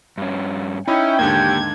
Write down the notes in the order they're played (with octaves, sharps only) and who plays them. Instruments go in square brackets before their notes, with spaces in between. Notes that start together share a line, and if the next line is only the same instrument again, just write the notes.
[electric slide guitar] G2 C#4
[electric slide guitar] C#4 [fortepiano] D#4 [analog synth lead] E4 [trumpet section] G5
[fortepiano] D#2 G#2 D3 [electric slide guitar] A#3 G4 [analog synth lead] G#6